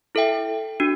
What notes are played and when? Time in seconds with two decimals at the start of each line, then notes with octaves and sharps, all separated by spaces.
0.15 E4 A4 E5 G5
0.80 D4 F#4